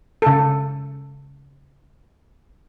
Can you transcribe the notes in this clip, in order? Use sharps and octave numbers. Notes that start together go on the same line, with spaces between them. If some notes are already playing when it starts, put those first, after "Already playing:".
C#3 A4